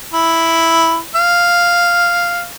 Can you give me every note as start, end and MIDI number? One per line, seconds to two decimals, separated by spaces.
0.14 0.98 64
1.15 2.45 77